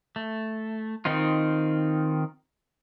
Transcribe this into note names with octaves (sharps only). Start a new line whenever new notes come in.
A3
D#3 C4 D#4 F4